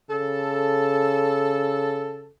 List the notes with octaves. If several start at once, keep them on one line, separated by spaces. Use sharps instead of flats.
C#3 A4